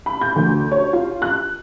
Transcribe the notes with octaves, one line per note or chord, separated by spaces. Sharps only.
B5
G6
D2
C#5
F4
F#6